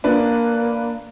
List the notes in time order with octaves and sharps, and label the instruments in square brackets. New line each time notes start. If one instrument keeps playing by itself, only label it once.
[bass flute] A#3 [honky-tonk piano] D4 B4